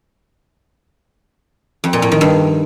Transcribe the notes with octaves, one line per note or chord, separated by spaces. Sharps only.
F2
A#2
A2
D#3
G2